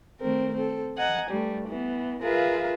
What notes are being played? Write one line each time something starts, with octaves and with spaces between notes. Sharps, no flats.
D#3 A3 C4 A#4
C4 A4
D#5 F#5 G#5 A#5
G2 G3 A3
E3 B3
F4 G#4 A#4 B4 E5 F5